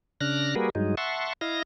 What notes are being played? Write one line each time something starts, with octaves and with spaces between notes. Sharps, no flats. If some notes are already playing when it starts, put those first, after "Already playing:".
C#3 D4 F6 F#6 A#6
G3 A#3 F#4 G#4 A#4 B4
G2 F#3 G#3 D#4
E5 F#5 A5 C6 C#6
E4 D#5 F5 A#6